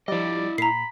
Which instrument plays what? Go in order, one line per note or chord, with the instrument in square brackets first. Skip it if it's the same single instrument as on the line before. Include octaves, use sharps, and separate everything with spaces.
[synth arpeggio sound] F3 G3 [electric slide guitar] E4 D#5 [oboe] D5
[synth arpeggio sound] A#2 [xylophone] A#5 C7 [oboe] B5